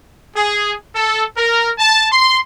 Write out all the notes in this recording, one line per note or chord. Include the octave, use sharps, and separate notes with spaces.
G#4
A4
A#4
A5
C6